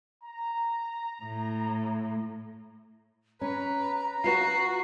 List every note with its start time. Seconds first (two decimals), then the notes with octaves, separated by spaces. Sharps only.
0.24 A#5
1.23 A2
3.41 C#4 B4 A#5
4.24 F4 F#4 B4 C7